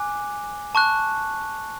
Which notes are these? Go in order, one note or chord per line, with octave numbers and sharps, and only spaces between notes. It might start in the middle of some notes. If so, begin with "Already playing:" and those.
Already playing: G#5 D6 F#6
A5 C#6 F#6